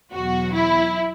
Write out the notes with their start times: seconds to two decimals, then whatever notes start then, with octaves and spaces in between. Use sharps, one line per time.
0.12 E2 B2 F#3 F#4
0.53 E4